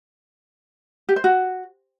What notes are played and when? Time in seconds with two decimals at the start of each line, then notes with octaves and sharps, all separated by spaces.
1.09 G4
1.16 C5
1.24 F#4